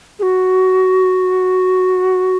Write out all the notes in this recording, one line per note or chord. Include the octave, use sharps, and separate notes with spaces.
G#4
F#4